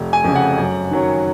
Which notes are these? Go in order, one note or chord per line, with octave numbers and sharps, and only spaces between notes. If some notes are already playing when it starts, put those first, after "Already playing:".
Already playing: F1
G#5
F2 C#3
F#5
F#2
D#3 F#3 C#4